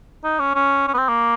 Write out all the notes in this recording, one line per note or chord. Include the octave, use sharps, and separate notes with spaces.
D#4
C#4
C#4
C#4
B3
C4
A#3